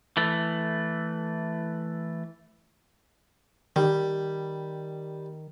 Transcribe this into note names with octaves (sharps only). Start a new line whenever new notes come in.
E3 A3
D#3 G3